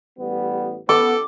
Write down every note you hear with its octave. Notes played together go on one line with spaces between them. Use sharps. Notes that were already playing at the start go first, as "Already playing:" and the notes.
A1 G3 B3
B3 A4 D6